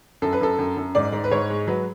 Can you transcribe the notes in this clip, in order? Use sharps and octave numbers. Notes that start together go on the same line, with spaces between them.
F#2 A4
B4
F#2 A4
F#2
F#2
G#2 D5
G#2
B4
G#2 C#5
G#3
F#3 B4